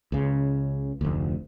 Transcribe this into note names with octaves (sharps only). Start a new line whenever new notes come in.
C#2 C#3
F1 D2